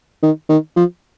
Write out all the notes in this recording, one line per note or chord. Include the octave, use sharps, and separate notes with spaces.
D#3
D#3
F3